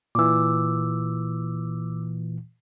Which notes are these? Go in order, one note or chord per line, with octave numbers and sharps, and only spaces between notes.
A#2 E3 D6 E6